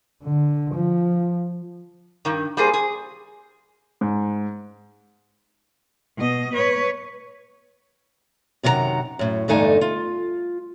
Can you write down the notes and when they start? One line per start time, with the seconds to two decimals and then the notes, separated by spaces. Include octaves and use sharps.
0.23 D3
0.74 F3
2.25 G2 D#3
2.57 G3 A#3 G#4 C5
2.74 G#4
4.01 G#2
6.17 B2 D#5
6.54 B4 C#5
8.63 F#2 C3 D#3 F4 F#5 A#5
9.19 F#2 A2
9.48 E2 G2 D3 A3 D#4 G#5
9.81 F4